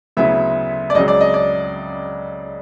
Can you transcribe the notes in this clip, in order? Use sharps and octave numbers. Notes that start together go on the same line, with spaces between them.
D2 C#3 F#3 B3 E4 E5
D5
C#2 C#3 F#3 D#5
D5
D#5
D5